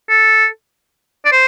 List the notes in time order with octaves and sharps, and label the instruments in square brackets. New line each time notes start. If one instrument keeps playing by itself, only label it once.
[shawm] A4
D5
C5